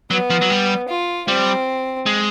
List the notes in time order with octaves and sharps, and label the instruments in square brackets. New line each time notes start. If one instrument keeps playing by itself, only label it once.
[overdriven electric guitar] F#3 [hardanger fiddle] B3
[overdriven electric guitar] F3
F#3
G3
[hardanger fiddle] F4
[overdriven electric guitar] G3 [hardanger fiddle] C4
[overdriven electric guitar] G#3